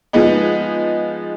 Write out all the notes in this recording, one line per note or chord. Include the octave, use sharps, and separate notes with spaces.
F3 G#3 B3 D#4